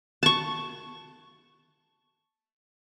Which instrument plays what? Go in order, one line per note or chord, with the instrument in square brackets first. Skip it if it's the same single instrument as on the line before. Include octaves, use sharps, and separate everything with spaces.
[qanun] A5 C#6